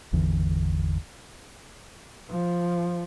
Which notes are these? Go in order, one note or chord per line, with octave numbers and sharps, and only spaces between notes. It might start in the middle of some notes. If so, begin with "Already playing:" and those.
G#1 E2 D3 E3
F3